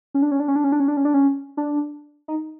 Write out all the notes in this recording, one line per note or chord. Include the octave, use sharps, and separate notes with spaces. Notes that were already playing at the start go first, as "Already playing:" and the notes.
C#4
D4
C#4
D4
C#4
D4
C#4
D4
C#4
D4
C#4
D4
C#4
D4
D#4